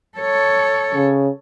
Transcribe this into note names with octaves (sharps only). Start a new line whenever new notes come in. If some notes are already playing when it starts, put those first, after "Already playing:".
A4 C#5
C#3